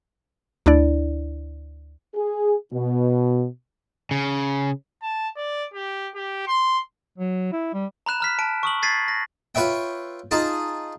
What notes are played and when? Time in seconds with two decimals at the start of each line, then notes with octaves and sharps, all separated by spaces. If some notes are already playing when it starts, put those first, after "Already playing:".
0.66 D2 D4 E4 D5
2.15 G#4
2.73 B2
4.11 C#3
5.02 A5
5.37 D5
5.74 G4
6.15 G4
6.48 C6
7.18 F#3
7.52 E4
7.74 G3
8.06 A#5 B5 F#6 E7
8.20 A#5 F6 B6
8.39 A5 D7
8.63 C#6 D#6 F#7
8.82 G#6 A6 B6 C7 D#7
9.08 A#6
9.55 F4 B4 C#5 E5 G5
10.31 D#4 F4 G#4 A5